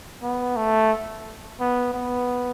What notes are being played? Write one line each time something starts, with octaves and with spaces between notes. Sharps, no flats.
B3
A3
B3
B3